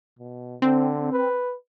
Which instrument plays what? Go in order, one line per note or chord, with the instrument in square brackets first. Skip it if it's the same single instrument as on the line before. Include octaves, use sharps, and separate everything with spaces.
[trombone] B2
[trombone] D3 [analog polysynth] C4
[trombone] B4